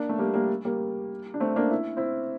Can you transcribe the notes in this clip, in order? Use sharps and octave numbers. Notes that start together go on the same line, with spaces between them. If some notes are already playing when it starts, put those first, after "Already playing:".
Already playing: A#3 D4
A3
G3 A#3
G3 A#3
G3 A#3
D4
A3 C4
A#3 D4
E4
C4 E4